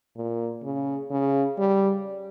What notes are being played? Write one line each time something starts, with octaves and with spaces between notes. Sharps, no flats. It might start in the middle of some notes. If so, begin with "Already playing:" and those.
A#2
C#3
C#3
G3